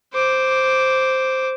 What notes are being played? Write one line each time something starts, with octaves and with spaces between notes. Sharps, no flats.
C5 D6